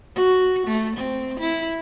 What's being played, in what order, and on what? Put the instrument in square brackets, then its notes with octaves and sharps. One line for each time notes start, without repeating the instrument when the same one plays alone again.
[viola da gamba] F#4
A3
C4
E4